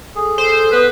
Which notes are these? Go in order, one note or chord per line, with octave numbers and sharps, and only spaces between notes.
G#4 A4
A4 C5
B3 B4